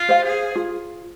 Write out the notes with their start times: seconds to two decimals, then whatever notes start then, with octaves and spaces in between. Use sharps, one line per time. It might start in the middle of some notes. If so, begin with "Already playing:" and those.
Already playing: F4
0.09 C5 F5
0.24 G#4
0.55 F4